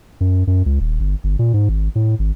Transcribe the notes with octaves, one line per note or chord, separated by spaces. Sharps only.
F#2
F#2
C#2
D#1
G1
G1
A#2
G#2
G#1
A2
G#1